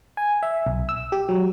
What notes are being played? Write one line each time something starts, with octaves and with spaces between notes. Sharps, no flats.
G#5
E5
B1
E6
G4
F#3